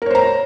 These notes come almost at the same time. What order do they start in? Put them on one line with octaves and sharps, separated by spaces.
A#4 C#5 C5 A#5